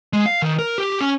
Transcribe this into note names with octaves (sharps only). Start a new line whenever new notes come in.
G#3
F5
D#3
A#4
G4
C#4